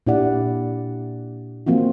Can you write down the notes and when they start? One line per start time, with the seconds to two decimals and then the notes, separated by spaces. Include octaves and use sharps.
0.07 A#2 D4 E4 G4 D5 F#5
1.66 F3 A#3 C4 F4 F#4